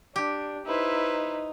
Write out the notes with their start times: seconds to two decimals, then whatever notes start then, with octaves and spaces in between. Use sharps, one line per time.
0.16 D4 G4
0.66 D#4 E4 B4 C5